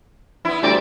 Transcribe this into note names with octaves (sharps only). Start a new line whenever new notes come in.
B3 E4
D2 G3 C4 D5